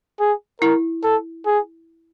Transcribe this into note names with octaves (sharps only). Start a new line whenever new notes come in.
G#4
E4 A#4
A4
G#4